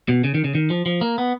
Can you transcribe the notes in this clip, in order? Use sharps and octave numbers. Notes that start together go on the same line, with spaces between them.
B2
C#3
D#3
C#3
D#3
F3
F3
A#3
B3